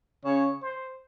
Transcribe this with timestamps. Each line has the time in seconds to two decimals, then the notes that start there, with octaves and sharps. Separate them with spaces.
0.24 C#3 C#5
0.62 C5